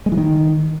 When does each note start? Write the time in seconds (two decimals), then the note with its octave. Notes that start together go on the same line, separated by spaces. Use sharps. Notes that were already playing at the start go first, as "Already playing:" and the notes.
0.06 G#3
0.12 E3
0.18 D#3